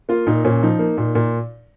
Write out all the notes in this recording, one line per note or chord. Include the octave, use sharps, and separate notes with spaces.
A#3 F4
A#2 D#4
A#2 C#4
F3 D#4
A#3
A#2
A#2